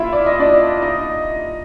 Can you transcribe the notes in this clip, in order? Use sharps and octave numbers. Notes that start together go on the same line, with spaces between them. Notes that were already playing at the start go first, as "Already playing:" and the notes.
Already playing: E4 F4 E5
D5
D#5
D4 D5
D#4 D#5